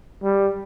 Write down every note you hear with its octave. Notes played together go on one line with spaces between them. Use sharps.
G3